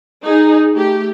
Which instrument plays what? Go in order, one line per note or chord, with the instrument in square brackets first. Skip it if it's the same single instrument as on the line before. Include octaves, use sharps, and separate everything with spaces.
[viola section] D#4 G#4
A3 G4